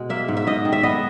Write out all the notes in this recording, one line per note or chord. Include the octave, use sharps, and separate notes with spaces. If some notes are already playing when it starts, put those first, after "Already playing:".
Already playing: B2 G#3
A#3 E5
G#2
E5
G#2 D#5
D#3
E5
B3 D#5